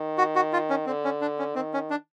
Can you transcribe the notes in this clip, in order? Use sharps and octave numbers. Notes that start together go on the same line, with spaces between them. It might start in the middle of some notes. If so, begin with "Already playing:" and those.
Already playing: D#3
F#4
F#4
F4
C#4
D3 C4
C#4
D4
C#4
D#3 C4
C#4
D4